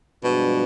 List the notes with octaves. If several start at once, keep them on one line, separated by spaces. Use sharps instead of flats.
G2 B2 F3 G#3 D4